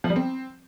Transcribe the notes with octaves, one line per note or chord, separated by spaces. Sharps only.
F3
G3
C4